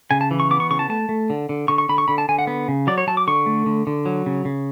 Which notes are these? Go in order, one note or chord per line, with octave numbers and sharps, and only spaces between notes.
C#3 G#5
A5
E3
C#6
B3 D6
C#6
C#3 C#6
A5
A3 A5
A3
D3
D3
D3 C#6
C#6
D3 B5
C#6
D3 B5
A5
D3 G#5
F#5
B3
C#3
F#3 D5
C#5
F#3 A5
D6
D3 C#6
A3
D3
D3
F#3
C#3
C#3